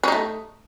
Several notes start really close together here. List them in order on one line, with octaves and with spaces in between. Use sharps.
C#4 D#4 A3